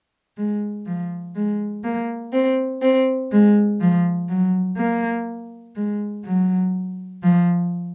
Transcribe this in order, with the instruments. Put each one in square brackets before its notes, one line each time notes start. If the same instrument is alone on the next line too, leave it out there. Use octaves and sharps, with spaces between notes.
[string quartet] G#3
F3
G#3
A#3
C4
C4
G#3
F3
F#3
A#3
G#3
F#3
F3